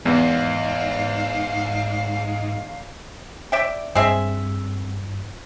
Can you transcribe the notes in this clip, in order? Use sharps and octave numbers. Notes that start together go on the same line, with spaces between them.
E2 G#2 F5
D5 E5 G5
G2 C4 G#4 E5